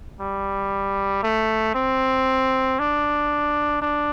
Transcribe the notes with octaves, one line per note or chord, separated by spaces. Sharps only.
G3
A3
C4
D4
D4